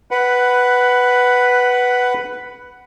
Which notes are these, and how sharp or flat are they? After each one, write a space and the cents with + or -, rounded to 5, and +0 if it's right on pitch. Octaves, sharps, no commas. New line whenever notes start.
B4 +0 F#5 +10